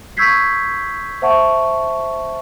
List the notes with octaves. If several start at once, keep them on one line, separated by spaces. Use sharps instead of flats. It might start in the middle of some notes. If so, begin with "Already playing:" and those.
C#6 E6 G6 G#6 B6 C7
C5 E5 F#5 A5 C#6